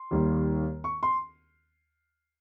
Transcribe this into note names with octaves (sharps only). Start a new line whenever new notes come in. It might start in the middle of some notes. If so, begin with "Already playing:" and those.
Already playing: C6
D#2 D#3 G3 A#3
C#6
C6